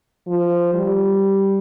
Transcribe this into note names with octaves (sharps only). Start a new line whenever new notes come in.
F3
G3